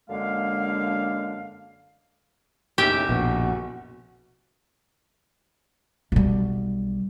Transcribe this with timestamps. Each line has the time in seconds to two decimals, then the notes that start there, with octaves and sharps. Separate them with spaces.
0.09 F#2 D3 G#3 A#3 D4 F5
2.78 F#1 B1 G4 E5
3.09 A#1 B2 F#4
6.12 B1 G3